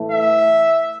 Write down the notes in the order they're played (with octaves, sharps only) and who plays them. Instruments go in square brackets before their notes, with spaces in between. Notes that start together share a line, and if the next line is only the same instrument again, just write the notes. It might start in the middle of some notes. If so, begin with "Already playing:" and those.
Already playing: [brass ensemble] A2 E3 A3
E5